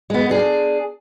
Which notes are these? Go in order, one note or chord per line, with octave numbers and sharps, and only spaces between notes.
G#3 B3
D4 G#4